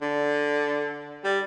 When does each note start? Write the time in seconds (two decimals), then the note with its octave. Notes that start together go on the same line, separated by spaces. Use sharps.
0.01 D3
1.24 G3